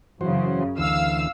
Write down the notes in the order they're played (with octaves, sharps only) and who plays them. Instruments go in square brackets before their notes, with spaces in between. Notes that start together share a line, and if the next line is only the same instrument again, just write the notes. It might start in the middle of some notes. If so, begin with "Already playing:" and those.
[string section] F#2 C#3 [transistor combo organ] E3 F#4 C5
[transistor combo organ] D2 E3 [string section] F5 E6